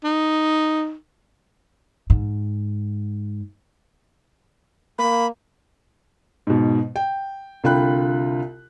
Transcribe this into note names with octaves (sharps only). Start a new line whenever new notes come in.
D#4
G#2
A#3 B5
G#2 B2
G5
C2 D3 F4 G5 B5 F#6